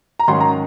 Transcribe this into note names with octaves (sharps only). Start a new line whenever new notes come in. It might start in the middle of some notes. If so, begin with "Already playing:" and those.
A#5
G#2 D#3 F#3 C#4 C6
A#5